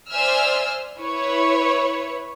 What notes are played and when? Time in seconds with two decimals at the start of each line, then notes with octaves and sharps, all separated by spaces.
0.11 C5 D5 E5 G#5 E6 F6
1.00 E4 B4 C#5